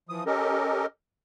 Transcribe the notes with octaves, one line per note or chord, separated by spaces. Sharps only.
E3 F3 D#6
C#4 G4 A4 A#4 D#5